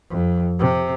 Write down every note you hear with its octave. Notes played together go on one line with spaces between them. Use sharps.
F2
C3